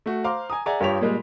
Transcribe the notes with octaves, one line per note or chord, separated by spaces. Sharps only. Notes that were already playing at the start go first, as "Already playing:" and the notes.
A3 F#4
C5 F5 A#5 C6 D6
G#5 A#5 D#6
G#4 D5 E5 F#5 G#5 A#5
G2 F4 G4 C#5 B6 F7
A#2 G3 G#3